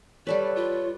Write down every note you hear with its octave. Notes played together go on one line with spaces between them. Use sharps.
G3 A4 B4 C#5 D5
F4